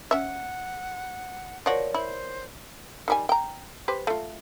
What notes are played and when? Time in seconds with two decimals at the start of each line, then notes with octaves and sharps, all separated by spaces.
0.11 C#4 E5 F#5
1.66 F3 F#4 A#4 C#5 D5
1.94 E4 C5
3.08 D#3 G3 G#5
3.29 G5 A#5
3.88 G4 B4 C5
4.07 A3 F4